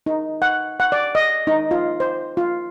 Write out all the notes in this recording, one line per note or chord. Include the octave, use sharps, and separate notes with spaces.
D#4
F#5
F#5
D5
D#5
D#4
F4
C5
F4